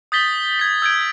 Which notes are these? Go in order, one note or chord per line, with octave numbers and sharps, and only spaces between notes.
D#6 G6 A6 B6 G7
G#6 B6
E6 G6 G#6 D7